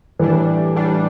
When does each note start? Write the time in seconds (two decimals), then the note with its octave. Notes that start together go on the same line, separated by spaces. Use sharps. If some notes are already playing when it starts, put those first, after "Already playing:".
0.19 A2 E3 G3 D4
0.76 A2 G3 D4